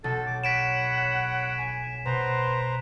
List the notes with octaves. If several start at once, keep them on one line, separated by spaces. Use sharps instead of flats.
B1 A4 A6
D6
C#5 F#5 B5 B6 D7 E7
G#5
B2 B4 C5 A#5 C6